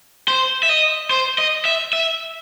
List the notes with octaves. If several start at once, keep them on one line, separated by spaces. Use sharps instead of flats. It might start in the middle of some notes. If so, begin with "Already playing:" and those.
C5
E5
D#5
C5
D#5
E5
E5